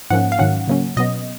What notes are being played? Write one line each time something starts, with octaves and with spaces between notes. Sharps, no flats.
G#2 F3 A#3 C#4 F#5
F5
G#2 D#3 F#3 C#4 F#5
C#3 F#3 A#3 C#4
B2 F#3 B3 D#5